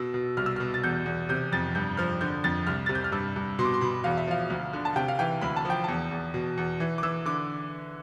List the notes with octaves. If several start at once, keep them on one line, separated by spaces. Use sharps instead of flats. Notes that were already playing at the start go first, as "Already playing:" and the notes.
Already playing: B2 E6
B2
C2 F6
E6
B2 F6
A6
E2 G6
E2
C3 G6
F2 A6
G2 G6
F3 F6
D3 G6
F2 A6
C2 F6
C3 A6
G6
F6
G2 E6
G2
B2 C6
D6
C6
B2 B5
E2 F5
E5
F3 F5
D2
D3
A5
C3 G5
F5
E3 G5
D2 B5
A5
F3 G5
E2 A5
E2
B2
E2
E3
D6
E3 E6
D3 D6